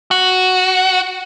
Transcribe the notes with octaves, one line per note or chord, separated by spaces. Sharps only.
F#4